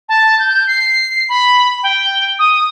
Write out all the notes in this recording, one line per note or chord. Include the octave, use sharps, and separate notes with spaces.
A5
G6
C7
B5
G5
D#6